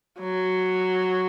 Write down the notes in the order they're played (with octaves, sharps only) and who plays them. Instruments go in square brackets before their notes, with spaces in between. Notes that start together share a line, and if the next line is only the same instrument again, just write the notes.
[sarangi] F#3